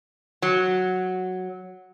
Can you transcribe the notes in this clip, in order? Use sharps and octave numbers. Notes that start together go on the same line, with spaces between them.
F#3